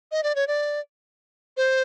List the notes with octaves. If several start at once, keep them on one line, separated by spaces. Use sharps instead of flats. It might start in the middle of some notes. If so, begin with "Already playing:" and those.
D#5
D5
C#5
D5
C5